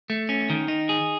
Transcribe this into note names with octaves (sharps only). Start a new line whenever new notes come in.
A3
C#4
D#3
D#4
G#4